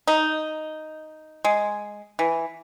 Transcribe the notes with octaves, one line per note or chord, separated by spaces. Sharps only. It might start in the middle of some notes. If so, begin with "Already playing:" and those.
D#4
G#3
E3